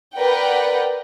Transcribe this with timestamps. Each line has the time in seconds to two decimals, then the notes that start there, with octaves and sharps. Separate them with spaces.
0.15 A#4 B4 D5 F#5 G5